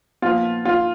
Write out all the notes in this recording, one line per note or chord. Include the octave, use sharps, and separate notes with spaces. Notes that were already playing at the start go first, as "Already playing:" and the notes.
A#2 F3 B3 F4
F4